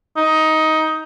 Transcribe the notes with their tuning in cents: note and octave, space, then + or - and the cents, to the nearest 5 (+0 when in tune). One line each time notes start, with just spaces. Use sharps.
D#4 +15